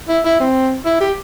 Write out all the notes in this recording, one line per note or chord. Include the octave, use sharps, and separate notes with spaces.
E4
E4
C4
E4
G4